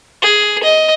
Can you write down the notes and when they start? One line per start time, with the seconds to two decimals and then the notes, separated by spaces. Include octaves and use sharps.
0.22 G#4
0.63 D#5